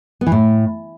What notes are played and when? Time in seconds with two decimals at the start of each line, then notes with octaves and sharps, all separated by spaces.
0.21 B3
0.27 E3
0.32 A2